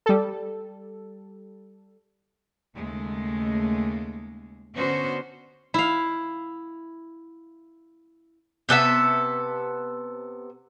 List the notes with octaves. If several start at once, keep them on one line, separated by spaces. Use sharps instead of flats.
G3 A4
D#2 C#3 G#3 A3
D3 B3 C#4 F#4 C5
E4 F5
C3 B3 A4 E5